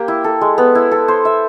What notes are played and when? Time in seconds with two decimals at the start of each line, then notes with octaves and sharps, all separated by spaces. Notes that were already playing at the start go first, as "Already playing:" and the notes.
Already playing: A#3 G4
0.08 E4
0.24 A4
0.41 G#3
0.58 B3
0.75 E4
0.92 A4
1.08 C5
1.25 E5